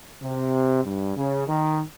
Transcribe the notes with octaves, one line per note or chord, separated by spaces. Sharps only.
C3
G2
C#3
D#3